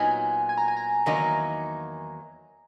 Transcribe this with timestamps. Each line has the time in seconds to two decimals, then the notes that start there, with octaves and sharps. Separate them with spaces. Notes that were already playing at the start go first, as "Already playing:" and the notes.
Already playing: A#2 F#3 B3 D#4 G#5
0.49 G#5
0.58 A#5
0.68 G#5
0.77 A#5
1.06 E2 D#3 F#3 A#3 D#4